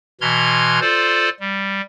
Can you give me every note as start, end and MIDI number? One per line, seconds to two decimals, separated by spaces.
0.21 0.80 47
0.21 0.80 52
0.21 0.80 82
0.21 0.80 84
0.21 0.80 89
0.21 0.80 92
0.81 1.29 65
0.81 1.29 69
0.81 1.29 72
0.81 1.29 74
1.40 1.81 55